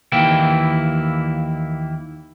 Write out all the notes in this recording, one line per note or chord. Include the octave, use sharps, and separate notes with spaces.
D#2 E3 A#3 E4 G5